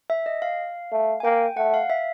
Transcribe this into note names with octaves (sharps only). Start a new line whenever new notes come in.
E5
D#5
F5
A3
G#5
A#3 G5
A3 F#5
F5
E5